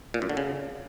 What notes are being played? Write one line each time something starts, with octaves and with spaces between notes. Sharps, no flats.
A#2
F#2
D3
C#3